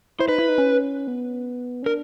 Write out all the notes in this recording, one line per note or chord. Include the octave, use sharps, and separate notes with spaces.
E4 C5
D#4 B4
E4
D#4
C#4
B3
C#4
D4 A#4